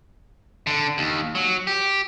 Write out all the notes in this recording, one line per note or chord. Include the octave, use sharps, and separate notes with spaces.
D3
D#2
F#3
G4